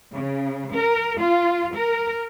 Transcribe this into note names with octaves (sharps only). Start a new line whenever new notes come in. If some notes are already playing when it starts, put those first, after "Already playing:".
C#3
A#4
F4
A#4